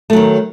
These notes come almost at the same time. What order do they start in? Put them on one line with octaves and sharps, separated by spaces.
A3 F#3 D#3